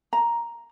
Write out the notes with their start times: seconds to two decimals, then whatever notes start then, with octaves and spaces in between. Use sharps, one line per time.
0.13 A#5